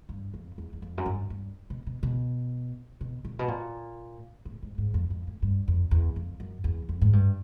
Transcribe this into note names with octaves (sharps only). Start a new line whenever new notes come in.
G2
F2
E2
E2
F2
F#2
G2
G2
B2
B2
B2
B2
A#2
B2
A#2
A2
G#2
G#2
F2
F2
A2
G2
F2
E2
F2
F#2
E2
F2
G#2
G2